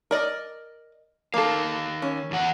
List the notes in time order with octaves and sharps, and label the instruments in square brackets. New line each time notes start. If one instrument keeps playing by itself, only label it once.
[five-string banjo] A#4 D5 D#5
[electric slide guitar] D#3 F5 [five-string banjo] A#3 A4
[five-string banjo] C#4
[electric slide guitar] E2 E3 F#5